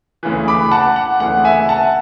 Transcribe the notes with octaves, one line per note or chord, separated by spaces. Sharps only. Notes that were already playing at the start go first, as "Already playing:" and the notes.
D2 C#3 E3
B5 D6
F#5 A5
F#5
D2 C#3 E3 F#5
E5 G#5
F#5 A5